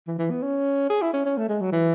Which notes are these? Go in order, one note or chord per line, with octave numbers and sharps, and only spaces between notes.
E3
E3
B3
C#4
G#4
E4
C#4
C#4
A3
G#3
F#3
E3